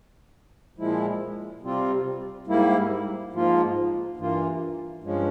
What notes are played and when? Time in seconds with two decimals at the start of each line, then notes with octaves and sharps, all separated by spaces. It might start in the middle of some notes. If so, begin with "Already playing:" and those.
0.78 A#2 F3 G#3 E4
1.62 C3 G3 C4 F4
2.47 G#2 G3 A#3 E4
3.33 G#2 F3 A#3 F4
4.17 G2 E3 A#3 F4
5.03 G2 F3 G#3 C#4